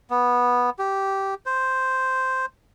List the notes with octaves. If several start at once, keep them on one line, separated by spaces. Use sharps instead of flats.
B3
G4
C5